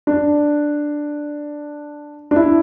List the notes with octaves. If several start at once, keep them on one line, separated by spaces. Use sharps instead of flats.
D4
D4
E4